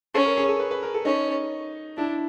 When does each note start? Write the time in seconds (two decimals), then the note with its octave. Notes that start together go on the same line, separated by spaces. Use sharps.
0.14 C#4 A4
0.25 A#4
0.37 G#4
0.48 A4
0.59 B4
0.71 B4
0.83 A#4
0.94 A4
1.05 C#4 D#4
1.97 D4 E4